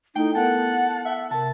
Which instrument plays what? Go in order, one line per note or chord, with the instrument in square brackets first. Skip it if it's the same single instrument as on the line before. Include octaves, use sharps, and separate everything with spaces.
[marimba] A3 E4 A4 [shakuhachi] D#4 [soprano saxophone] G5
[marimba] B3 A4 A#4 [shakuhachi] F#5 [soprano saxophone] A5
[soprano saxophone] E5
[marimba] C3 A#4 [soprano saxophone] A5